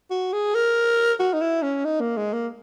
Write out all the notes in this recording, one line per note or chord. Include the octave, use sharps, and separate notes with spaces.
F#4
G#4
A#4
F#4
D#4
E4
C#4
D#4
A#3
G#3
A#3